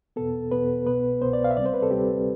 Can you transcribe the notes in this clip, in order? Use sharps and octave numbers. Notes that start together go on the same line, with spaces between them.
E2 B2 B3 A4
E2 B2 B3 B4
C2 B2 B3 B4
C2 B2 B3 C5
D5
F5
E5
D2 C3 G3 C4 D5
C5
B4
A4
D2 C3 G3 C4 G4